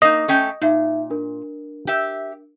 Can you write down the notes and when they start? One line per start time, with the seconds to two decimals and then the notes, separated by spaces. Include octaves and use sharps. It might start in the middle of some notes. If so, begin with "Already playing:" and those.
0.02 A#3 D#4 D#5
0.28 A3 C#4 G5
0.62 A#2 D#4 E5
1.10 D4 A#4
1.87 G4 E5